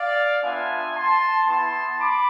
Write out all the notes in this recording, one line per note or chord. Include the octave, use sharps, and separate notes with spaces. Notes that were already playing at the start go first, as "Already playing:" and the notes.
Already playing: D5 F5
B3 D4 F4 E5 G#5
A5 C6
B3 E4 A5 C6
B5 D6